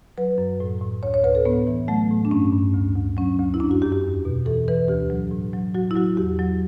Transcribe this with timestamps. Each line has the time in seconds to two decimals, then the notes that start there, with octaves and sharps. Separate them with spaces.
0.18 F#3 B4
0.38 F#2
0.60 A2
0.81 A2
1.03 D2 C#5
1.14 C#5
1.24 D2 B4
1.35 A4
1.46 A2 B3
1.67 E3
1.88 F#3 A3
2.11 A2
2.25 D4
2.31 G2 C#4
2.52 G2
2.75 D2
2.96 D2
3.17 F#3 C#4
3.39 D2
3.54 E4
3.60 F#2 D4
3.71 F#4
3.82 F#2 G4
3.92 G4
4.03 E2
4.25 B2
4.46 E3 A4
4.68 E3 B4
4.88 D2 G4
5.10 F#3
5.31 A2
5.53 F#3
5.75 F#3 F#4
5.91 E4
5.96 F#3 F#4
6.17 E2 G4
6.39 F#3